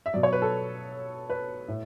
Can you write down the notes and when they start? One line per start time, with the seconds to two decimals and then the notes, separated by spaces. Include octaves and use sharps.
0.06 E5
0.13 B2 F#3 D5
0.23 C#5
0.33 B4
0.42 A4
1.30 B4
1.68 A2